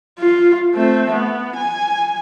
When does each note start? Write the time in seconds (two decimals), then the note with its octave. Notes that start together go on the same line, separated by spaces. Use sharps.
0.20 F4
0.75 A3 C4
1.12 B3
1.57 G#5